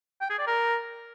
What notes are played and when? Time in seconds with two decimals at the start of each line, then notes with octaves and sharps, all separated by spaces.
0.21 G5
0.30 G#4
0.38 D5
0.47 A#4